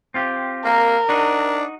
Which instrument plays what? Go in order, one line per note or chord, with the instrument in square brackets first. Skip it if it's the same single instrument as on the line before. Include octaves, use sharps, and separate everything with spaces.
[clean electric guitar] C4 F4 G4
[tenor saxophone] A#3 [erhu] A#4
[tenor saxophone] D4 [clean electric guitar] D#4 F#4